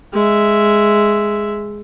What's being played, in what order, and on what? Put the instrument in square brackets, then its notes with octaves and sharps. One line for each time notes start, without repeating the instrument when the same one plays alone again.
[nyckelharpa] G#3 E5